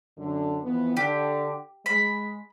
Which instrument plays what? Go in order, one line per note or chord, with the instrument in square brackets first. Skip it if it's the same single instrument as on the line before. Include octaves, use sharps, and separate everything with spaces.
[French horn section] F#2 D3
F2 E3 B3
[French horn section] D3 [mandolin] G4
[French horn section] G#3 [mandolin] B5